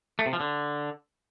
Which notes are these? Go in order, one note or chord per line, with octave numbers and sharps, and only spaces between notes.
A3
C3
F3
D3